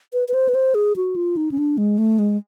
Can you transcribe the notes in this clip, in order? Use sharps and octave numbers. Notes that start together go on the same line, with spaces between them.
B4
B4
C5
B4
C5
G#4
F#4
F4
D#4
C#4
D4
G#3
A3
G#3